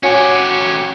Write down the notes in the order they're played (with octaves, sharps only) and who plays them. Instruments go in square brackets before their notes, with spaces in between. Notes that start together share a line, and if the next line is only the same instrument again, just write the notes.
[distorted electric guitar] C#4 G4 [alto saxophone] F#4 [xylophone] C#5 G#5 C#7